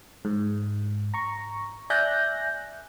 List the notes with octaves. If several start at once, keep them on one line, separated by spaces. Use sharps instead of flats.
G#2
A#5 C#6
D5 E5 G#5 F#6 G6 A#6